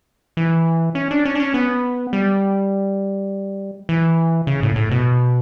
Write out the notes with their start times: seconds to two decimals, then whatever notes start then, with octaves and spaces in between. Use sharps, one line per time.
0.37 E3
0.95 C#4
1.11 D4
1.25 C#4
1.35 D4
1.40 C#4
1.54 B3
2.13 G3
3.89 E3
4.47 C#3
4.63 A2
4.76 A2
4.91 B2